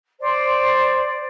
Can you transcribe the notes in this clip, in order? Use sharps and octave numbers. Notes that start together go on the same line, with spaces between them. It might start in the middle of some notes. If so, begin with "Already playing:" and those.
C5 D5